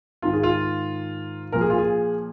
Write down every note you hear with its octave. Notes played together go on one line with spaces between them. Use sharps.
G#2 D#3 F4
G#4
F4
A#2 F3 A#4
G#4
F4
G#4